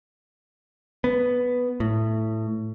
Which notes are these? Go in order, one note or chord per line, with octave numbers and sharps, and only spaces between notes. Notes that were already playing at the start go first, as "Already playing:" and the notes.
B3
A2